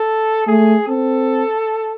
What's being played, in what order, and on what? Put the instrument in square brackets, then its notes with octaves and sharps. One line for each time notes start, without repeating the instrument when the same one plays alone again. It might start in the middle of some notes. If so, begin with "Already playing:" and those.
Already playing: [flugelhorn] A4
[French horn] A3 [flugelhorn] G#4
[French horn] C4 [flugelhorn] A4